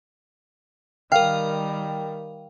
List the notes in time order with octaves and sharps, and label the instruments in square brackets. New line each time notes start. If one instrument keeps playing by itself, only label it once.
[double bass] D#3 G3 [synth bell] A#4 G5 [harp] F5